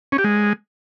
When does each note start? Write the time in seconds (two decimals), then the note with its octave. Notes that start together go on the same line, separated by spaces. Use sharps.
0.12 C#4
0.18 G4
0.24 G#3